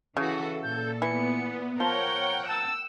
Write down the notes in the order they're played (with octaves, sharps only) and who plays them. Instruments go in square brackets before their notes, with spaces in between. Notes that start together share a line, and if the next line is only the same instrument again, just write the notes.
[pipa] C#3 [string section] E3 F#4 [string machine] A4
[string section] A#2 [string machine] A4 [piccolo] G6
[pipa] E3 [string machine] B3 [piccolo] C#7
[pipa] F3 [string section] A#4 C#5 [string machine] F#5 G5 [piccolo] G7
[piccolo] A5 [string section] E6